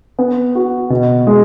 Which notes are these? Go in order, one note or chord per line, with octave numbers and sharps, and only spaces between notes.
B3
F#4
B2
G#3